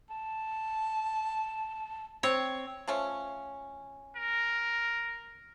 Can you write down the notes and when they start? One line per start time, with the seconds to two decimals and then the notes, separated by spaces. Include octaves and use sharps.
0.10 A5
2.23 C4 C#5
2.88 F3 A3 C#4
4.16 A#4